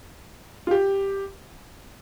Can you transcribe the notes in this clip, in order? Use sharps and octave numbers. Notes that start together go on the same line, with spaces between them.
F4
G4